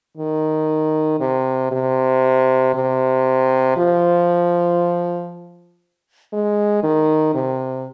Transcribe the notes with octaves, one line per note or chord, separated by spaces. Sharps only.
D#3
C3
C3
C3
F3
G#3
D#3
C3